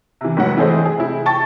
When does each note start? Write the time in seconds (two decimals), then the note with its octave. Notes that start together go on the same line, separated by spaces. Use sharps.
0.21 C3 E3
0.37 F1 G#2 F#3 F#5
0.57 E3 A3 G#4 C5 D#5
0.85 G#4
0.97 C3 E4
1.26 G5 A5 C#6 A6